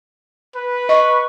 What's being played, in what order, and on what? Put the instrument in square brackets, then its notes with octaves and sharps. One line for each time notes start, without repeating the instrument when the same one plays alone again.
[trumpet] B4
[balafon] D#5 [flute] C#6